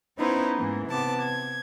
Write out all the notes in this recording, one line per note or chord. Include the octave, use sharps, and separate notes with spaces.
B3 C#4 D#4 E4 B4 C5
G#2 E3 A#3
C3 B3 A5 D6
G#6